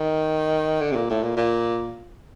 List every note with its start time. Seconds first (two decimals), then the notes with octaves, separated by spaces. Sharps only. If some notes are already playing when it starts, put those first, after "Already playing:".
Already playing: D#3
0.81 D3
0.92 C3
0.96 A#2
1.10 A2
1.23 A#2
1.36 A#2